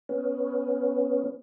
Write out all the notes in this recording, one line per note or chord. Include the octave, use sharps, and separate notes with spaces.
B3 C#4